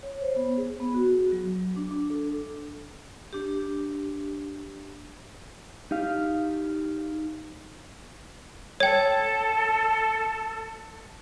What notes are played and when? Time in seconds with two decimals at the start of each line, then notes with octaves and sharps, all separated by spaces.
0.03 C#5
0.21 C5
0.36 B3
0.57 G#4
0.80 B3
0.94 F#4
1.32 F#3
1.76 D4
1.91 D4
2.10 A4
3.33 D4 G4
5.91 D#4 G4 F5
8.80 A4 C#5 G5